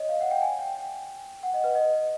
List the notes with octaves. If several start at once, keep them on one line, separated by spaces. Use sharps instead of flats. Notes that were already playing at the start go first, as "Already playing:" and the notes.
Already playing: C#5 D#5
F5
F#5
G5
G#5
G5
G5
F#5
D#5
B4
D#5